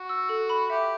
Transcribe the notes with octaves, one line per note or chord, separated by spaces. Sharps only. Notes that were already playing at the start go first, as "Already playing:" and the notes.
Already playing: F#4
E6
A4
B5
G4 E5